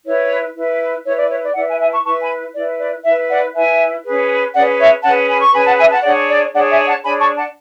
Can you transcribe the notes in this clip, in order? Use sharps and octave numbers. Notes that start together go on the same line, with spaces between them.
E4 B4 C#5
E4 B4
E4 B4 C#5
D5
C#5
D5
E4 B4 D5 F#5
E5 G#5
E5 G#5
A5 C#6
E4 B4 A5 C#6
G#5 B5
E4 B4 D5
D5
E4 B4 C#5 E5
D5 F#5
E4 B4 E5 G#5
C#4 G#4 B4
C#4 G#4 B4 D5 F#5
C#5 E5
C#4 G#4 B4 F#5 A5
G#5 B5
C#6
C#4 G#4 B4 G#5 B5
F#5 A5
E5 G#5
F#5 A5
D4 G#4 C#5 D5 F#5
D5
D4 G#4 C#5 D5 F#5
E5 G#5
F#5 A5
D4 G#4 C#5 G#5 B5
A5 C#6
F#5 A5